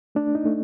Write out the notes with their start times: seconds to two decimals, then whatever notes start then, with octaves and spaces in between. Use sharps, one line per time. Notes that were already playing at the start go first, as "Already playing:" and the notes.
0.15 A3 D4
0.35 D#4
0.46 A3